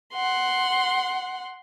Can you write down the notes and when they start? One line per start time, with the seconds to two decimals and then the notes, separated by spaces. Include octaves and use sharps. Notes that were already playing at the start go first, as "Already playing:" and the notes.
0.13 F#5 C6